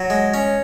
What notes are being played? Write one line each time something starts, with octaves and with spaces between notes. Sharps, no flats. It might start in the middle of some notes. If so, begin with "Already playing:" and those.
Already playing: F#3
G#3
C#4